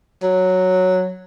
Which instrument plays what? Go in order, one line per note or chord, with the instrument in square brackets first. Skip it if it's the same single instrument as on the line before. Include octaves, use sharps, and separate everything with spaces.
[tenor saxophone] F#3